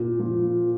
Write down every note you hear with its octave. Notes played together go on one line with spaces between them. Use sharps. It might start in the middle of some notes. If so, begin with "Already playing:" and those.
Already playing: A#2
F3